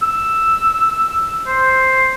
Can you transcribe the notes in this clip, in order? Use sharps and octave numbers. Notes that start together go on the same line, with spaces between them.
E6
C5